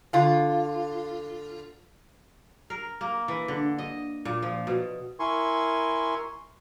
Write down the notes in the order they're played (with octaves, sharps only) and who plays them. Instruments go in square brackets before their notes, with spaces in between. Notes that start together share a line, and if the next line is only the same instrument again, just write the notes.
[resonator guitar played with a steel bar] D3 F4
[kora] A#4
A#3
E3
D3
D#5
A#2
F3
B2
[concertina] E4 A#4 G#5 C6 C#6